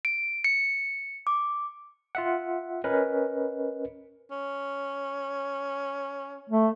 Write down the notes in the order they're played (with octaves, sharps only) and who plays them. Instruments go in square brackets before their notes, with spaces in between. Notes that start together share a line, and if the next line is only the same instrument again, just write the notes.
[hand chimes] D7
C#7
D6
[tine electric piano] F4 E5 F#5
C#4 A#4 B4 D#5
[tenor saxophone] C#4
[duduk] A3